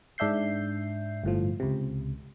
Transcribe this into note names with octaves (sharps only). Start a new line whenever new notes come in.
G#2 D4 E5 G6 C7
G1 A2 F3
C#2 C3